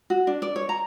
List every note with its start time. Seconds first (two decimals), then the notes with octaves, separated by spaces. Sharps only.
0.10 F#4
0.27 D4
0.42 D5
0.56 C#5
0.69 A#5